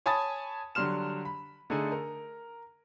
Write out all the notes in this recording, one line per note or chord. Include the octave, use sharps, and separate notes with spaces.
C#5 G#5 A5 B5 D#6 A6
D3 F#3 G3 C6 F6 E7
B5
D3 A3 D#4 G#4
A#4